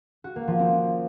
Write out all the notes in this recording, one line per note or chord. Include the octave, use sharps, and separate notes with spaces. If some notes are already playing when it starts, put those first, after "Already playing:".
F#4
A#3
F3
C4